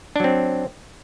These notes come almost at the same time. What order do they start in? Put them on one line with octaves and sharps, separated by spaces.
D4 F#3 C4